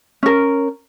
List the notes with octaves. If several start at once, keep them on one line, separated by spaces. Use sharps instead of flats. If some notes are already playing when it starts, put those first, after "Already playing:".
C#4 A#4